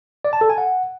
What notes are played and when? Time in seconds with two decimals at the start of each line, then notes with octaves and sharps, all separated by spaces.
0.25 D5
0.33 A5
0.41 A4
0.50 G#5
0.58 F#5